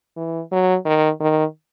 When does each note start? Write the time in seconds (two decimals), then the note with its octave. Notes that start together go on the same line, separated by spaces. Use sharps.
0.17 E3
0.52 F#3
0.86 D#3
1.20 D#3